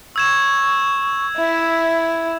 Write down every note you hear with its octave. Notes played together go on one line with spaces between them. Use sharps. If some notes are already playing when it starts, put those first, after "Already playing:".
C#6 E6 G#6 E7
E4 E5